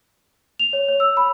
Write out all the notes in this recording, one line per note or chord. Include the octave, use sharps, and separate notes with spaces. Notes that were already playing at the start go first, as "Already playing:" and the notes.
F7
C#5
C#5
E6
B5